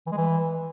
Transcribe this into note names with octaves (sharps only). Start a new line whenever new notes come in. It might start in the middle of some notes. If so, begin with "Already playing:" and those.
E3
G#3
E3